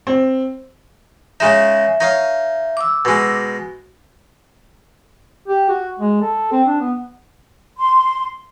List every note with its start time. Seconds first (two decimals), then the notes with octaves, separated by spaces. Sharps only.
0.07 C4
1.40 C#3 G#3 D#4 E5
2.00 D#4 C#5 F5
2.77 D6 E6
3.05 B2 G#3
5.48 G4
5.69 F#4
5.99 G#3
6.21 A4
6.52 C4
6.67 D4
6.80 B3
7.79 C6